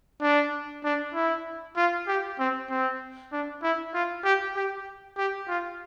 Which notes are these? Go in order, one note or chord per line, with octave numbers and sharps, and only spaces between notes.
D4
D4
E4
F4
G4
C4
C4
D4
E4
F4
G4
G4
G4
F4